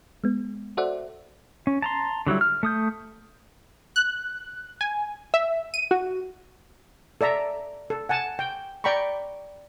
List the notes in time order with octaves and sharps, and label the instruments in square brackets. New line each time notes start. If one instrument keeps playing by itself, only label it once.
[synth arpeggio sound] G#3 B3
F#4 A4 C5 D5 E5 F#5
[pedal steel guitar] C#4
A5 A#5 C6
D3 F#3 G3 E4
F6
A3 D#6 G6
[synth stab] F#6
G#5
E5
D#7
F#4
[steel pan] A4 D5 E5 A#5
A4
F#5 G#5 A5
G5
D5 G5 A#5 B5 C#6